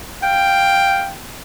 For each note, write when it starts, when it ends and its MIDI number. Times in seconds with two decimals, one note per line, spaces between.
0.21 1.10 77
0.21 1.10 79